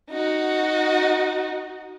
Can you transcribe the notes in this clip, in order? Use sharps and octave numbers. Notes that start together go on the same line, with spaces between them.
D#4 F#4